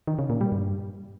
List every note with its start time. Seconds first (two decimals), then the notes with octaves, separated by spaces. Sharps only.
0.07 D#3
0.19 C#3
0.30 A#2
0.41 G3
0.52 G2